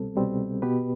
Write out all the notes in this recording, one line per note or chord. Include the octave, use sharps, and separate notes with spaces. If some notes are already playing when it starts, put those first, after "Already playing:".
Already playing: C2 B2 G3 C4 A4
C2 B2 G3 C4
B2 B3 G4 B4